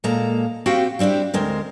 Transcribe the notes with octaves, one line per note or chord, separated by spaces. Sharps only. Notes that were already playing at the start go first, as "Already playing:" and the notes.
A#2 G#3 A#3 A4 A#5
C4 F#4 G4 F5 G5
G3 C4 D4 E4 G4
D2 G#3 C4 A#4